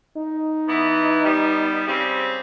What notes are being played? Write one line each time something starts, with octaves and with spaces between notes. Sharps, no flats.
D#4
E3 B3
G3 B3
C#3 G3 C4